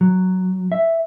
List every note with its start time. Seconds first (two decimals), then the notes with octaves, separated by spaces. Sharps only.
0.01 F#3
0.72 E5